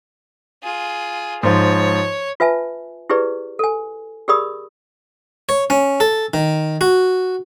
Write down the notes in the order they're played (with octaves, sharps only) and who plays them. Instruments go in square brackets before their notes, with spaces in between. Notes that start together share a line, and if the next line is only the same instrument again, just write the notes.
[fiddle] F4 G#4
[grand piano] G#2 F3 [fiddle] C#5
[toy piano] F4 B4 E5 G#5 A5
E4 G4 G#4 B4 D5
A4 G#5
G4 G#4 A#4 D5 B5 D#6
[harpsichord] C#5
C#4
A4
D#3
F#4